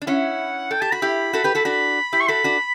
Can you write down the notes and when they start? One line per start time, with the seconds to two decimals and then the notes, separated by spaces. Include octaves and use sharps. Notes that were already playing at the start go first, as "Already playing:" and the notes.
0.02 D4
0.07 C#4 E4 F#5
0.71 A4 G5
0.81 G4 A5
0.92 F#4 B5
1.02 E4 G4
1.33 F#4 A4
1.44 G4 B4
1.55 F#4 A4
1.65 D4 F#4 B5
2.13 E4 G4
2.20 C#6
2.28 F#4 A4 B5
2.44 D4 F#4